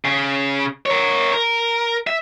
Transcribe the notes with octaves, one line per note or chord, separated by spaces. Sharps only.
C#3
A#4 C#5
A#4
E5